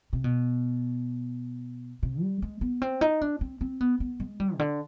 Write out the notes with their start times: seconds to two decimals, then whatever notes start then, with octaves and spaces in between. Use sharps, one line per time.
0.13 C3
0.24 B2
2.03 C3
2.22 G3
2.42 G#3
2.61 B3
2.82 C4
3.01 D#4
3.21 D4
3.41 C4
3.61 C4
3.81 B3
4.00 B3
4.20 G#3
4.40 G3
4.55 C3
4.59 D3